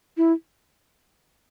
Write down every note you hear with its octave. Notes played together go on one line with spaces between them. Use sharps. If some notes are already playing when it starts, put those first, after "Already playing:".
E4